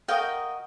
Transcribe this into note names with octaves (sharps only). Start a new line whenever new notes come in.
F#4 A#4 D#5 F5 G5